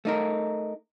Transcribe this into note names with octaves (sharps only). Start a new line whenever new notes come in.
A3 D#4 A#4